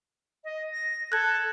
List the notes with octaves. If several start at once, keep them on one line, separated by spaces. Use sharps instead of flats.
D#5
A#6
A4 F#6 G#6